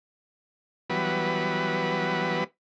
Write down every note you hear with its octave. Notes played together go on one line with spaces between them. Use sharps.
E3 F#3 G3 B3 B4